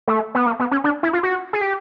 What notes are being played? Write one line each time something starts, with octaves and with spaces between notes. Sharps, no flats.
A3
B3
A#3
B3
C#4
D4
E4
F4
F#4
G#4
G4